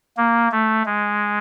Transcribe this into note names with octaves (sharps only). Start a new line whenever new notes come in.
A#3
A3
G#3